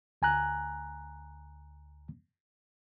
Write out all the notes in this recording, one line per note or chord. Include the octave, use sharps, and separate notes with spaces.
D2 G#5 A#5 F#6